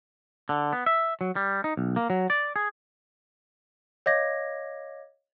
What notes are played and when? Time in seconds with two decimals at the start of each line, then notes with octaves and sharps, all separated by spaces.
0.49 D3
0.73 B3
0.86 E5
1.21 F#3
1.36 G3
1.64 D#4
1.77 B1
1.96 A#3
2.10 F#3
2.30 D5
2.56 G#4
4.06 C#5 D#5 F5 D6 G#6 A#6